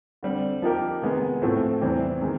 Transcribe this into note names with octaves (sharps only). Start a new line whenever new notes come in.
D3 G3 C4
F3 A#3 D#4 G4 A#4
C3 D#3 G#3 B3
A2 F3 A3 C4
E2 C3 E3 G3 C4
C3 D#3 G#3